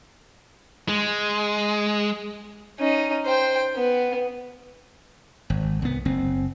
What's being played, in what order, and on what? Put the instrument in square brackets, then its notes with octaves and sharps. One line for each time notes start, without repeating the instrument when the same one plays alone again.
[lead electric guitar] G#3
[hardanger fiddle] C#4 D#4
C5 G5
B3
[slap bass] G#1
C2 B3
F#1 C4